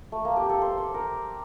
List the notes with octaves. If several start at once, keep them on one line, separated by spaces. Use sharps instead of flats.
A3
A#3
G4
A4
C5
C5
A#4